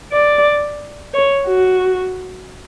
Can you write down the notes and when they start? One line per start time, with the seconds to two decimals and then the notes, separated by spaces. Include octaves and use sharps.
0.12 D5
1.14 C#5
1.47 F#4